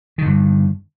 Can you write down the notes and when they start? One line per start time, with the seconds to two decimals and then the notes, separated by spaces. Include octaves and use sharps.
0.18 D#3
0.22 D3
0.26 G2